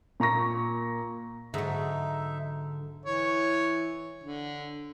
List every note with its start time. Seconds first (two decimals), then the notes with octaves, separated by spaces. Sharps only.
0.20 A#2 A#5 C#6 A#6
1.54 G#2 D3 F#3 D#4 E5
3.06 E3 C#5
4.23 D3